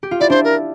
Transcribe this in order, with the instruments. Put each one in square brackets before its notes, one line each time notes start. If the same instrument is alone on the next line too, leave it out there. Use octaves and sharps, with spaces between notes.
[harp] G4
F4
[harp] E4 [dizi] D5
[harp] D4 [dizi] C5
[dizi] A#4